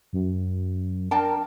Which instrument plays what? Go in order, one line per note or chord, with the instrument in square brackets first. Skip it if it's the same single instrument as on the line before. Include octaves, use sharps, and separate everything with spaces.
[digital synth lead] F#2
[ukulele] D4 G5 A5 [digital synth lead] A#4